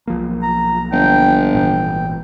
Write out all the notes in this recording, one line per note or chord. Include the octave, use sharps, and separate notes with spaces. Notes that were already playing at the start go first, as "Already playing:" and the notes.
B1 F3 A#3
A#5
G1 G5
G#1 A#2 E3 G5